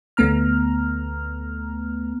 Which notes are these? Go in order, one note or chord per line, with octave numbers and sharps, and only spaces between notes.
D2 A3 B3 A#5 F6